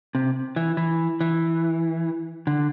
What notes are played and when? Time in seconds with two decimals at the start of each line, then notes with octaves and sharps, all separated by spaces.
0.15 C3
0.56 E3
0.77 E3
1.21 E3
2.47 D3